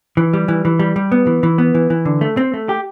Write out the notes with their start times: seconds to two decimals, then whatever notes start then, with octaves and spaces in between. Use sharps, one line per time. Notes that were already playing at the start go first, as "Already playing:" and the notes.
0.17 E3
0.34 G3
0.48 E3
0.65 E3
0.80 G3
0.96 G3
1.12 B3
1.27 E3
1.43 E3
1.58 B3
1.75 E3
1.90 E3
2.05 D3
2.21 A3
2.37 C4
2.54 A3
2.69 G4